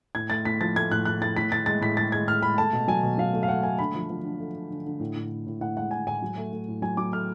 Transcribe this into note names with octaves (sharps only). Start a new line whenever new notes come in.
A2 G#6
A3 A6
A2 B6
F3 A6
A3 G#6
A2 F#6
A2 F#6
A2 A6
A2 B6
A2 A6
G#3 A6
A2 B6
G#3 A6
G#3 G#6
A2 F6
G#3 B5
A3 A5
B2
F#3 G#5
B2
F#3 F5
A3
F5
A3 F#5
A3 G#5
D3 B5
F3
F3
D3
A3
D3
D3
D3
A2
A2
A2
A2
A2 F#5
G#3 F#5
A2 G#5
A2 G#5
F#3
A3
A3
A2
F#3 G#5
F#3 D6
A3 F6